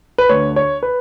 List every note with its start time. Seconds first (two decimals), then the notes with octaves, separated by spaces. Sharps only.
0.18 B4
0.29 D2 D3 C#5
0.56 C#5
0.83 B4